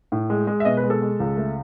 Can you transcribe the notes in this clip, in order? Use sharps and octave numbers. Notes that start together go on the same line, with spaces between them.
A2
G#3
G#3
E5
B2 D#5
B4
G#3
A4
G#3
C#2
A3